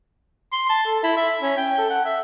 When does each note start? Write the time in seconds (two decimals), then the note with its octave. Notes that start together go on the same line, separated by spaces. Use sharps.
0.52 C6
0.69 A5
0.86 A4
1.04 E4
1.17 E5
1.42 C#4
1.57 G5
1.78 A4
1.90 F#5
2.05 E5